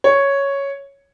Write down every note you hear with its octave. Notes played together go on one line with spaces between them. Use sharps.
C#5